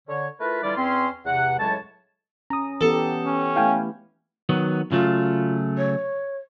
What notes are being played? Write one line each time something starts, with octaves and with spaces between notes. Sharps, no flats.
D3 C#5
A3 E4 F4 A#4 B4
D3 E3 G3 E4 F4 D5
E2 C4 C#4 C6
E2 C3 F#5
C#2 A2 F#3 G#3 C#5 A5
C#4 A#5 D#6
E3 B3 G4 A4
C#4
A3 E4 F5 G5 G#5
D#3 F#3 B3
C#3 F#3 A3 F4
C#5